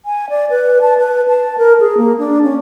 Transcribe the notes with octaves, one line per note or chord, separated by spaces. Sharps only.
G#5
D5
B4
A5
B4
A5
A#4
G#4
A#3
D4
C#4